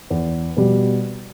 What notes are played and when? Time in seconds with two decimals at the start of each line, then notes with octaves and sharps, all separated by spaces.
0.10 E2
0.57 B2 G3